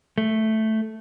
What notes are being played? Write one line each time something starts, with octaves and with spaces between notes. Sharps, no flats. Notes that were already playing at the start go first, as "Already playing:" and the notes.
A3